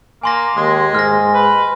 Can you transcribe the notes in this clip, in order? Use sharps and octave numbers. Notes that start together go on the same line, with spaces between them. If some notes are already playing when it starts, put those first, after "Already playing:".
A#3 G#5 C6 A#6
D#2 G#3
G#2 F6 A#6
B4